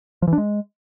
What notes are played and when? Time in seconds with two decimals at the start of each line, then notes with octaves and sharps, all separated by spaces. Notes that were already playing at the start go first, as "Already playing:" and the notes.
0.22 F3
0.28 E3
0.33 D4
0.38 G#3